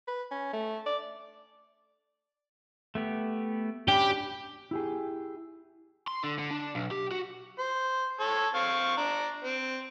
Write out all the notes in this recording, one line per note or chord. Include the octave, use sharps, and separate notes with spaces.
B4
C#4
A3
D5
A3 B3 G4
C#4 D4 G4 B5
E4 G4 G#4
C6
D3
D3
D4
B1
G4
F#4
C5
A4 C#5
C4 F5 C#6
D4 A#5
C4